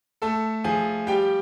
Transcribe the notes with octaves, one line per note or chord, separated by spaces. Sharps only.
A3 A4 A5
F3 G#4 G#5
G3 G4 G5